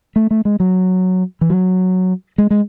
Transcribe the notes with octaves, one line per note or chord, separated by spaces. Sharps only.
A3
A3
G#3
F#3
E3
F#3
G#3
G#3